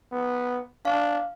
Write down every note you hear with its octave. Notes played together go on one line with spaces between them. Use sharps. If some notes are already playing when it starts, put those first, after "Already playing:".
B3
D4 F5